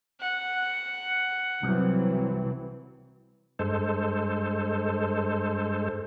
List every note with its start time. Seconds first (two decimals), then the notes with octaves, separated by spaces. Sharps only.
0.21 F#5
1.63 C2 E3 F#3 C4
3.59 G2 G#3 A4 C5